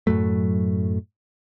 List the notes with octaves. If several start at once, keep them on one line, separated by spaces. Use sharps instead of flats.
F#2 A2 F#3 A3